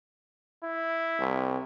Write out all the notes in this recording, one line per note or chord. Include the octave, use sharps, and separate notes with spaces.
E4
C2